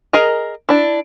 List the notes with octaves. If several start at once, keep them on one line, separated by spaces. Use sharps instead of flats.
G#4 A#4 D#5 A#5
D4 E4